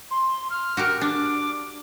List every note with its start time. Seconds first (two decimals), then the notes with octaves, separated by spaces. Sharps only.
0.11 C6
0.50 F6
0.77 F#4 G4 A#4
1.01 D4 D6